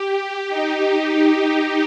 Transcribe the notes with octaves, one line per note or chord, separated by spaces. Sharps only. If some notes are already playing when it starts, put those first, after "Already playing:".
Already playing: G4
D#4